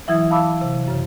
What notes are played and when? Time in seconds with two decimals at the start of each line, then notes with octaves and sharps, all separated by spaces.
0.08 E3 F#3 E4 E5 D#6 G#6
0.30 F5 A5 B5 D6 E6
0.61 C3
0.88 F#2 C#3